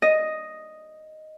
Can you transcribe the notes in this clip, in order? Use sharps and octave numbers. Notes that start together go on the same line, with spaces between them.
D#5